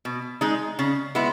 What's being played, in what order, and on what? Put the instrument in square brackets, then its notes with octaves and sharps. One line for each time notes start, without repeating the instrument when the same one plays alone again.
[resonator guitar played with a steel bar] B2
G#3 D#4
C#3
G#3 B3 E4